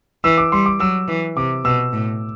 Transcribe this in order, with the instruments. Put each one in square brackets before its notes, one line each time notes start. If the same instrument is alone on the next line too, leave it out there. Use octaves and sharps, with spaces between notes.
[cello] E3 [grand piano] E6
[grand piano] D6
[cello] G3 [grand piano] C6
[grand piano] D6
[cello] F#3 [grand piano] E6
[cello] E3
[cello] C3 [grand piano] D6
[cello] B2 [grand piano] E6
[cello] A2